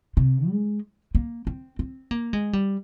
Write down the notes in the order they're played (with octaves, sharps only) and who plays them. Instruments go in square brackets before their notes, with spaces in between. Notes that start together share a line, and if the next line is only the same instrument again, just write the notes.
[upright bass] C3
G#3
A#3
C4
C4
A#3
G#3
G3